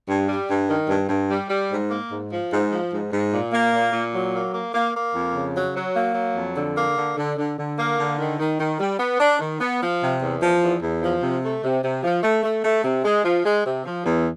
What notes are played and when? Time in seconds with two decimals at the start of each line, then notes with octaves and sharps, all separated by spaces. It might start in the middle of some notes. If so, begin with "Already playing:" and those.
0.08 G2
0.28 G3
0.48 G2
0.68 D#3
0.88 G2
1.09 G2
1.30 G3
1.49 G3
1.70 G#2
1.89 A#3
2.10 G#2
2.30 F3
2.51 G#2
2.70 F3
2.92 G#2
3.11 G#2
3.31 A#2
3.52 A#3
3.72 A#2
3.92 A#2
4.13 F#3
4.33 A#3
4.53 A#3
4.74 A#3
4.94 A#3
5.13 F2
5.34 C#3
5.54 F#3
5.75 F#3
5.94 A#3
6.15 F#3
6.35 F2
6.55 D3
6.77 A#3
6.96 D3
7.16 D3
7.37 D3
7.58 D3
7.77 A#3
7.98 D3
8.18 D#3
8.38 D#3
8.59 D#3
8.79 G3
8.98 B3
9.19 D4
9.39 D#3
9.59 B3
9.80 F3
10.01 C3
10.20 E2
10.40 F3
10.61 E2
10.82 E2
11.02 F3
11.22 C3
11.43 A3
11.63 C3
11.83 C3
12.03 F3
12.23 A3
12.43 A3
12.64 A3
12.84 C3
13.04 G#3
13.24 F3
13.44 G#3
13.64 C3
13.85 F3
14.05 E2